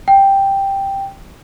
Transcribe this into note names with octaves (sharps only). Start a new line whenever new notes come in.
G5